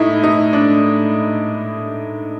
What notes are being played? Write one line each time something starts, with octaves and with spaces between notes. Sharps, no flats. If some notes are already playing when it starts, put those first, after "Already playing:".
Already playing: A2 D#4 E4
D#4
D4